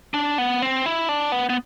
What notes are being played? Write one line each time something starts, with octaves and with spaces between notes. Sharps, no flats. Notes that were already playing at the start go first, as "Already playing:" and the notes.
D4
B3
C4
E4
D4
B3
B3